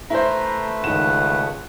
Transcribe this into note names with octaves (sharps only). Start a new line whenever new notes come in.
A3 E4 B4 C5 A#5
C#2 D#3 F#5 E7